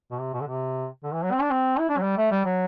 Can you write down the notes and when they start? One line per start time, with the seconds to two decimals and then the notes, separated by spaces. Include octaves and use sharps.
0.11 B2
0.19 C3
0.34 B2
0.41 D3
0.47 C3
1.04 D3
1.13 E3
1.23 F#3
1.32 C4
1.41 D4
1.51 C4
1.79 E4
1.89 D4
1.97 F#3
2.03 G3
2.17 A3
2.31 G3
2.45 F#3